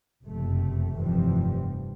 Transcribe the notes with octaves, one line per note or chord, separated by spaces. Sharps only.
F#1 F2 C3 A3
F1 G2 E3 F3 G3 C4